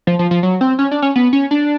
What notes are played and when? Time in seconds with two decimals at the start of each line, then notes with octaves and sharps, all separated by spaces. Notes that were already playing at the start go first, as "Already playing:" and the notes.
0.07 F3
0.19 F3
0.31 F3
0.43 F#3
0.61 C4
0.79 C#4
0.91 D4
1.02 C#4
1.16 B3
1.33 C#4
1.51 D4